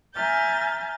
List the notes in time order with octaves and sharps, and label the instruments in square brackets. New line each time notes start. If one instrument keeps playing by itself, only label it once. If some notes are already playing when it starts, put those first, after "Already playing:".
[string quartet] E5 G#5 A#5 F6 G6 A6